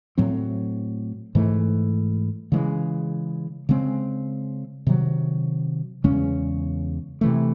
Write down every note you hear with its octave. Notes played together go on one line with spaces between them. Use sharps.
A2 F#3 C4
G#2 E3 A3
C#3 E3 G#3
C#3 G#3 C4
C3 D#3 F#3
E2 C#3 G#3 C#4
C3 E3 A3